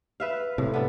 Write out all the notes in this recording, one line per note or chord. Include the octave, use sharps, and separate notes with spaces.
B4 E5 F5
A2 C3 A3
B3 D4